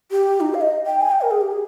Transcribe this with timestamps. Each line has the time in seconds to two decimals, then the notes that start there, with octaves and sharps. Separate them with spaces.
0.11 G4
0.41 D#4
0.54 F5
0.61 D#5
0.86 G5
1.01 G#5
1.11 G5
1.21 A#4
1.31 G#4
1.41 G4
1.51 G#4